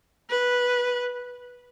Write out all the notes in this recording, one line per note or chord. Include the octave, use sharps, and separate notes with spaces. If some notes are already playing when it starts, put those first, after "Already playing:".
B4